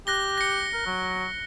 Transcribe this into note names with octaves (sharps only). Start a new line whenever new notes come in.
G4 F#6 A#6 G7
A#6 C#7
A#4
F#3